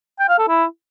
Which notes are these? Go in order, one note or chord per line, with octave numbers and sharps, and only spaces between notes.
G5
F5
A4
E4